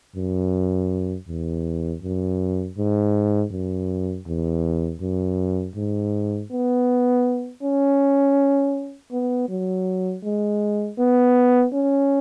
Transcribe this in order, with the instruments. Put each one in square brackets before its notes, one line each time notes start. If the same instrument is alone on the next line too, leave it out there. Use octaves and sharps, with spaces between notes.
[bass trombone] F#2
E2
F#2
G#2
F#2
E2
F#2
G#2
B3
C#4
B3
F#3
G#3
B3
C#4